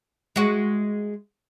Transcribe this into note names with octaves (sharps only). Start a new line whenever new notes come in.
G#3 F#4